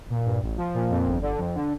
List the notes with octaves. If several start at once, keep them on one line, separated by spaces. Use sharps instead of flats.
A#2
G2
A1
F3
A#2
F2
G1
D3
F2
D3